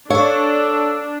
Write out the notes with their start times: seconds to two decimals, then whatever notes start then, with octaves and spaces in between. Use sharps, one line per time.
0.10 D4 A4 C#5 F5 C#6